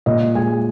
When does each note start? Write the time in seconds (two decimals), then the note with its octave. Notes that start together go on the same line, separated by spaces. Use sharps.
0.06 A#2 D#5
0.35 G#3 G#5